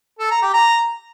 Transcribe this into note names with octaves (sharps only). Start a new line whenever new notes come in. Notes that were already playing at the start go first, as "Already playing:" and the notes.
A4
A#5
G4
A#5